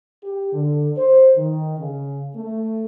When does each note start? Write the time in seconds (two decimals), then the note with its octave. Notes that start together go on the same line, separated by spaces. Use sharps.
0.23 G4
0.52 D3
0.96 C5
1.36 D#3
1.77 C#3
2.36 A3